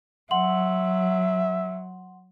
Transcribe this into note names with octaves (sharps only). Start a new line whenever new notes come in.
F#3 E5 F#5 C6 F#7